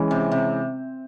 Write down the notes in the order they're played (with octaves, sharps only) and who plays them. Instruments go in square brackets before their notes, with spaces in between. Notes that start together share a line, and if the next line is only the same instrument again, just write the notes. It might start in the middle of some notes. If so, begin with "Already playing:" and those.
Already playing: [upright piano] E3 G#3 C#4
[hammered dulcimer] C3
C3